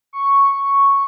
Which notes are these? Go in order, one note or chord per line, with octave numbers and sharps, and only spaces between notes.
C#6